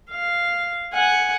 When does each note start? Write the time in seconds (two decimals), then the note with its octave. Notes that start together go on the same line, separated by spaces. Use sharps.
0.11 F5
0.94 F#5 G#5